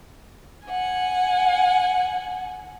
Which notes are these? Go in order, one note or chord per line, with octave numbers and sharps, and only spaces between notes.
F#5 G#5